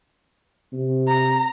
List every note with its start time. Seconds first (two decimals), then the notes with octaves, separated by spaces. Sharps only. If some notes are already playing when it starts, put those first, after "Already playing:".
0.73 C3
1.07 A#5